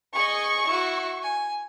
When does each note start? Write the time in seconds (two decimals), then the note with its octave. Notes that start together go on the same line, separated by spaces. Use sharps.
0.15 G#4 D#5 C#6
0.65 E4 F#4
1.22 G#5